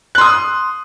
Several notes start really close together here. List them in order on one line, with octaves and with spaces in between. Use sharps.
F#6 C6 D#6